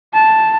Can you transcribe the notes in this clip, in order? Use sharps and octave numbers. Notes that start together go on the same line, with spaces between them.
A5